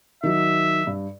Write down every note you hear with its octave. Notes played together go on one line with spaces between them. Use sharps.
D#3 F#3 E5
G2